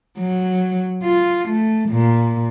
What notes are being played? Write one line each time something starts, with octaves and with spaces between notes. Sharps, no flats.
F#3
F4
A3
A#2